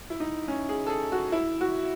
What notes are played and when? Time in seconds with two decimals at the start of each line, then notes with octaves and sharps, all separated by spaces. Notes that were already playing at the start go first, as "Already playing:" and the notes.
0.10 E4
0.20 D#4
0.48 C#4
0.69 G#4
0.86 A4
0.90 G#4
1.12 F#4
1.32 E4
1.61 F#4